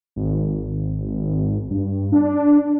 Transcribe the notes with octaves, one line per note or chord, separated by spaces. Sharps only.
G#1
G2
D4